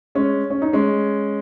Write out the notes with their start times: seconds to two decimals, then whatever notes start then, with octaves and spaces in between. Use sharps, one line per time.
0.15 G#3 C#4
0.50 C#4
0.62 D#4
0.73 G#3 C#4